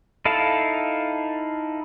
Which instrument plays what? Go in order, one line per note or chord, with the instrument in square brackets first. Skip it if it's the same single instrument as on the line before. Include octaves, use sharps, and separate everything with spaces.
[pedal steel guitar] D#4 E4 A4 F5 A5